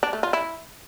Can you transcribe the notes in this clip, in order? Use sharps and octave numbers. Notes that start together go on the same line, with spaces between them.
D4
A3
F4
E4